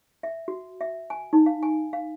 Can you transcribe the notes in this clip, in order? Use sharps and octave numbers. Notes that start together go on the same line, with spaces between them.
E5
F#4
E5
G#5
D#4
F5
G#5
F5